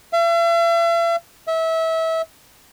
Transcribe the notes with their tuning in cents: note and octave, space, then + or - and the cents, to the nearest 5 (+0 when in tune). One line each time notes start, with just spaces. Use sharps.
E5 +45
E5 -25